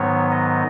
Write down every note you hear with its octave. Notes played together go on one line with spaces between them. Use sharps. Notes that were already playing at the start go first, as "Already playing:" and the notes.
Already playing: G#2 D#3 F#3 B3 C#5
D#5